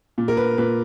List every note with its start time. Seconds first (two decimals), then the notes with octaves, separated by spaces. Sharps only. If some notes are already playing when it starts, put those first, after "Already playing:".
0.18 A#2
0.28 A#4
0.37 B4
0.58 A#2 B4